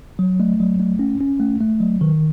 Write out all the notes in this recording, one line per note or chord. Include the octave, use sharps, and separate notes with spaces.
F#3
A3
F#3
A3
C#4
C#4
A3
A3
F#3
D#3